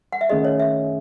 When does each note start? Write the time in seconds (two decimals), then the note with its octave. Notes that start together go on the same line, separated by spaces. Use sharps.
0.12 F#5
0.21 E5
0.29 D#3 A3 C#4 G#4 D#5
0.45 C#5
0.59 E5